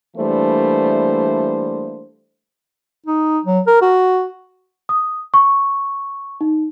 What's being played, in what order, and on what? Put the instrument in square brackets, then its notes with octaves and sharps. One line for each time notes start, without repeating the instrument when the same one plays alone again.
[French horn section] E3 G3 A3 A#3 D4 C5
[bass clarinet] D#4
F#3
A#4
F#4
[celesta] D#6
C#6
D#4